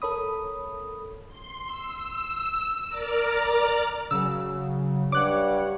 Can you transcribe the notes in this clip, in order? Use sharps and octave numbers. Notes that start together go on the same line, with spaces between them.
A4 A#4 C#5 B5 D#6
C6
E6
A#4 D5 A#5 D6 F6
C#3 F#3 E6
G2 C#5 F#5 D6 F#6